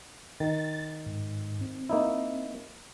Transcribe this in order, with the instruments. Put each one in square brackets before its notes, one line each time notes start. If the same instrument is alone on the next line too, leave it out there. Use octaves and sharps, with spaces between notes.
[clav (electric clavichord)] D#3 [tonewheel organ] A6
[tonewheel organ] G#2
C4
[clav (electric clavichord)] A#3 D#4 E4